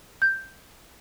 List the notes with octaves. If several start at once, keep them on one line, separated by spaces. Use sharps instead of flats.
G6